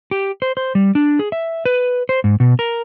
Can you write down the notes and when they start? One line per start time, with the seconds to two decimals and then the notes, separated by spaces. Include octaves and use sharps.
0.11 G4
0.42 C5
0.57 C5
0.75 G3
0.95 D4
1.19 G#4
1.32 E5
1.65 B4
2.09 C5
2.24 G#2
2.40 B2
2.59 A#4